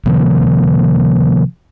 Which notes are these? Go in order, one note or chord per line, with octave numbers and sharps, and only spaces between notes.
C3 D#3 F3 A#3